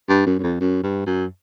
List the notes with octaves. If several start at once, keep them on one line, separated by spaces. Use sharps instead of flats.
G2
F#2
F#2
F2
F#2
G2
F#2